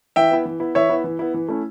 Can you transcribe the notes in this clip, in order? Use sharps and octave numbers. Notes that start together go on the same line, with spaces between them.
E3 E5 G5
B3 E4
E3
B3 E4
E3 C#5 E5
B3 E4
E3
B3 E4
E3
A3 C#4 E4